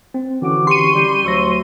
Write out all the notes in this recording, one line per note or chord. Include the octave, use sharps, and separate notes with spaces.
C4
D3 E3 C#4 F#4 D6
G4 C6 C#6 D#7
G3 G4
D2 F#3 C#6 E6 A#6